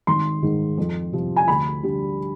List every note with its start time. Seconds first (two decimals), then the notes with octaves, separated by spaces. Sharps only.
0.07 G#1 C6
0.42 G#2 D#3 G#3
0.78 F2
1.13 C3 F3
1.36 G#5
1.48 D2 B5
1.83 D3 G3